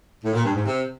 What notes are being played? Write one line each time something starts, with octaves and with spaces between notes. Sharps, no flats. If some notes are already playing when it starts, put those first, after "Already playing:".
A2
A#2
G2
G#2
C3